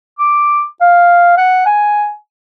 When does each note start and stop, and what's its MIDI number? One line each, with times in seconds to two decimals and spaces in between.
0.19 0.64 86
0.81 1.33 77
1.37 1.65 78
1.66 2.12 80